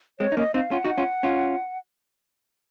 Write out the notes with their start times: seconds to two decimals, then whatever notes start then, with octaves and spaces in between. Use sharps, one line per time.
0.19 G#3 C4 C#5
0.32 D#4
0.37 A#3 C#4 D#5
0.54 C4 D#4 F5
0.71 C#4 F4 F#5
0.84 D#4 F#4
0.98 C#4 F4
1.23 C#4 F4